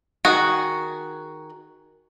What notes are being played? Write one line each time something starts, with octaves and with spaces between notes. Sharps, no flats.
D#3 F#4 G#4